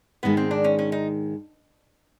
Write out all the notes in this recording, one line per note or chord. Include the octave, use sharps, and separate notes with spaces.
G#2 D#3 G#3 B3
C4
D4
C#4
C#4
D#4